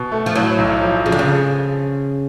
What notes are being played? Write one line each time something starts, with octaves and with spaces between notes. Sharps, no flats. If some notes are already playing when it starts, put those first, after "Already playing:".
Already playing: B2
A3
F3
A2 F#3
B1
F3
C#3 F3
D3
C#3